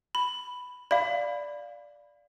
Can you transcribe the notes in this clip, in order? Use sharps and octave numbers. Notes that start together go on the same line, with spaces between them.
B5
D5 F5 B5